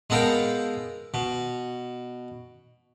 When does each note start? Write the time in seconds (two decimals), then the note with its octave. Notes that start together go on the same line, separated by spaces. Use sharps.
0.10 G#3 B3 A4 A#4 F5 G5
1.14 B2